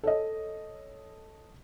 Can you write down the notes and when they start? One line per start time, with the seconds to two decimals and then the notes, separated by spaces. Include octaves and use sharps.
0.03 A4 C#5 D#5